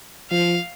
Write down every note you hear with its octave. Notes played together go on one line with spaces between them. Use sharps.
F3 F5